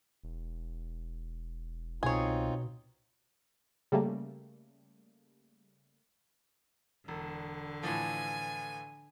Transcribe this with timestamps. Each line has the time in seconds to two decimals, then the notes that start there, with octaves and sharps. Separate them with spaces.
0.24 E1
2.03 C2 B2 C4 D#4 F4 G#4 C#5
3.92 C#3 G3 A3 A#3
7.08 E1 D3
7.83 A2 E3 F3 G#5